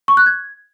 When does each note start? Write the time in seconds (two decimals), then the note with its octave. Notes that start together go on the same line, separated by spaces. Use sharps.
0.08 C#6
0.17 F#6
0.26 G#6